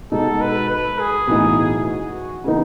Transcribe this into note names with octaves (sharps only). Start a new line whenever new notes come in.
B2 G#3 D#4 A4
B4
B4
G#4
B1 A2 E3 B3 D#4
F#4
C#3 E3 B3 D#4